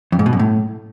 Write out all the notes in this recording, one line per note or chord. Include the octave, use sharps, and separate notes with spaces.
F2
G#2
B2
F#2
A2